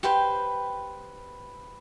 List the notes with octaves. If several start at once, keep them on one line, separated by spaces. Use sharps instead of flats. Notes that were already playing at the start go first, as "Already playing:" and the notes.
G4 B4 C5 G5